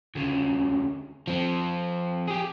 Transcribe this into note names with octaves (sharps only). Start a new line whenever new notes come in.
D2 C#3
F3 C4
G4 G#4